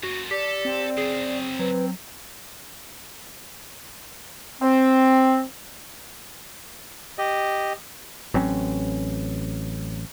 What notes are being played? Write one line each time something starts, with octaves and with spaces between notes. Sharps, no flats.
F#2 A#2 F#4
G4 A4 D5
C4
F#2 C#3 G#4
F#3 B4
C4
G4 D#5
A1 F#3 C4 C#4